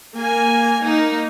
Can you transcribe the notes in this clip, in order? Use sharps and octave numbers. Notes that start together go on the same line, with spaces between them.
A#3 G#5
A#3 D#4